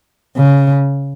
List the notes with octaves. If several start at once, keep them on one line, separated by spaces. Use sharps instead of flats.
C#3